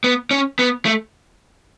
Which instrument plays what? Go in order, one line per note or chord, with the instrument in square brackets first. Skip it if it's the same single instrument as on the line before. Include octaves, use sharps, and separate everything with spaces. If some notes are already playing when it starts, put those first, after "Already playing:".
[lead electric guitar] B3
C#4
B3
A3